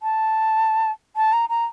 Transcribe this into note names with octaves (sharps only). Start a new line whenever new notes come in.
A5
A5
A#5
A#5